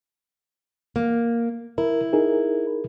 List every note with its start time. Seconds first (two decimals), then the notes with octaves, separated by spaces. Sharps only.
0.96 A#3
1.78 E4 A#4
2.13 D#4 G#4 A#4